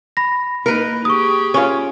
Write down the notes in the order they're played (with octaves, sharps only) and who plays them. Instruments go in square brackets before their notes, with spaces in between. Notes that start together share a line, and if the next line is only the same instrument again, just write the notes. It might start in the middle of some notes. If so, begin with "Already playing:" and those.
[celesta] B5 A#6
[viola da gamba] A#3 D#4 [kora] A#4 B4
[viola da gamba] G4 G#4 [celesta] C#6 D#6
[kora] C#4 F4